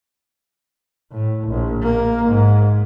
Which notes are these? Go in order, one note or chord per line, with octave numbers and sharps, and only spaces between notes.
A2
A#1
A#3
G#2